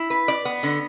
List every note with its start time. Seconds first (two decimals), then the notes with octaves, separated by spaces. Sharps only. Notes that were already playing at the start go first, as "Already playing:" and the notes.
Already playing: E4
0.10 B4
0.28 D5
0.45 B3
0.63 D3